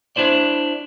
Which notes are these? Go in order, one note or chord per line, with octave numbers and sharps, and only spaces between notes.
D4 E4 C5 D5